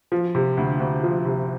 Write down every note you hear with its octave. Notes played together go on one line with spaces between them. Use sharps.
F3
C3
D2
D2
F3
C3